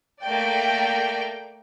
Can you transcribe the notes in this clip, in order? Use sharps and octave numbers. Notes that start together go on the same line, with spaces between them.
A3 A#3 D5 G5